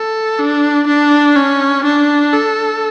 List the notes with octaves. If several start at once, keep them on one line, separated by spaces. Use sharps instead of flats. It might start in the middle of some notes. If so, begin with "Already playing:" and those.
Already playing: A4
D4
D4
C#4
D4
A4